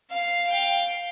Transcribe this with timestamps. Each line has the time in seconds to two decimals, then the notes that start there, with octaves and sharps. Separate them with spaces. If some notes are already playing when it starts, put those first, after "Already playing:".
0.11 F5
0.48 F5 G5